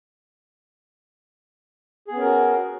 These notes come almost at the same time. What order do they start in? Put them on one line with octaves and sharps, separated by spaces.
G#4 B3 C#4 A#4 F#4